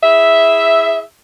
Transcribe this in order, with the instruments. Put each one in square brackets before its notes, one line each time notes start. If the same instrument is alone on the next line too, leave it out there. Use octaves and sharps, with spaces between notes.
[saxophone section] E4 G#4 E5